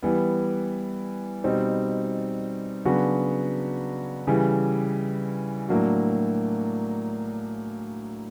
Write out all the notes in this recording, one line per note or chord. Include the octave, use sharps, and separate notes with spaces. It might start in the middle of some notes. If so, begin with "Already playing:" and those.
E3 G3 B3
B2 G3 C4 D#4
C#3 F#3 B3 D4 F#4
C#3 E3 G3
A2 F#3 A#3 D4 F#4